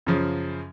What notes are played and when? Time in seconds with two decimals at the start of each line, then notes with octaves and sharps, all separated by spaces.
0.06 F#2 C#3 F3